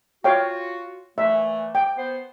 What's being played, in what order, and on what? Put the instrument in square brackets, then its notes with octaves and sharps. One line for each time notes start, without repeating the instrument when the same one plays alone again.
[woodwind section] F4 F#4 [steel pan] C#5 F5 G5
[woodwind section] A#2 E3 A3 [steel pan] E5
[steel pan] G5
[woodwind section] B3 C5